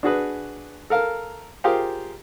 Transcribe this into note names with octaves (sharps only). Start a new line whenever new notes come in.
D4 F#4 G#4 B4
A4 A#4 F5
F4 G4 G#4 A#4 C5 F5